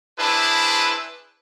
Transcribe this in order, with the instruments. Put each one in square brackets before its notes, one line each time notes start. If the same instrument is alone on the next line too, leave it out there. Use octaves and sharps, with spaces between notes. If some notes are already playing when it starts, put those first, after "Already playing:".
[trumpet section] D4 E4 G#4 B4 C5 A5